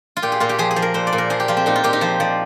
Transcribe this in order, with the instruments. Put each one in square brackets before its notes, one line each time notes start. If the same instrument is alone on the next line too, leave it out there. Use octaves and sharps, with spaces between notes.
[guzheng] F4
A#2 G4
G#4
A#2 F4
G4
F3 G#4
G#4
F3
A#4
A#2 C5
D5
A#2
A#4
F3 G#4
G4
F3 F4
C4
A#2 D#4
F4
A#2 G4
D#4
F3 C5
F3 D5